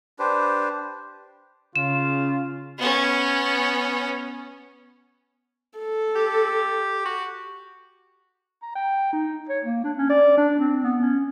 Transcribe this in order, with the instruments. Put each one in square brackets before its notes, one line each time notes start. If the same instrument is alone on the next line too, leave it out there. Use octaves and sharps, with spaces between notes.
[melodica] D4 G4 B4 C5
[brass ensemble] C#3 [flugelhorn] F4 [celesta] E7
[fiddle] B3 C#4
[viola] A4
[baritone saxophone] G4
F#4
[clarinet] A#5
G5
D#4
C#5
A#3
D4
C#4
D5
D4
C4
B3
C#4